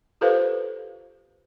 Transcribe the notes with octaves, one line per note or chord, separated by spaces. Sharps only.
F4 G4 A4 B4 C5 F5